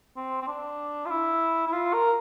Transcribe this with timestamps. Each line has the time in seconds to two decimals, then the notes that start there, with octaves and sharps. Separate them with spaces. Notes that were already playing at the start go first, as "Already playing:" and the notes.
0.17 C4
0.42 C4
0.48 D4
1.06 F4
1.11 E4
1.67 E4
1.73 F4
1.93 A#4